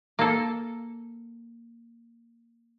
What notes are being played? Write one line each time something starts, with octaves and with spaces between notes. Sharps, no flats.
A#3 A4